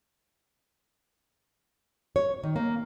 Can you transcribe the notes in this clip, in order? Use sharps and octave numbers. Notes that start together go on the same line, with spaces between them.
C#5
D#3
A#3